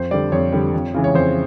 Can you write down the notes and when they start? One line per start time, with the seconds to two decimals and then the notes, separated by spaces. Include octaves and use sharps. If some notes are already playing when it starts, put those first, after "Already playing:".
Already playing: F2 C5
0.11 D3 G3 D5
0.32 F2 C#5
0.52 D3 G3
0.74 F2
0.94 C#3 E3 G#3
1.04 C#5
1.14 F2 C5